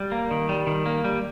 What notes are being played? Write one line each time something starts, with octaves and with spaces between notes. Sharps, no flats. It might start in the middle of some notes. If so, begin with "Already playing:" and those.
Already playing: G3
A#3
D#3
G3
D#3
A#3
G3